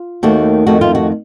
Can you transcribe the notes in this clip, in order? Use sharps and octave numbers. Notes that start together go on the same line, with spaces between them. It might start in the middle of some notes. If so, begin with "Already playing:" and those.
Already playing: F4
D#2 D#3 A3 F#4
F2 D#3 A3 F#4
F4
F#4